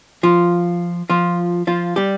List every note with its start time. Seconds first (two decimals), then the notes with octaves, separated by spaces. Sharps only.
0.23 F3 F4
1.10 F3 F4
1.67 F3 F4
1.96 G3 G4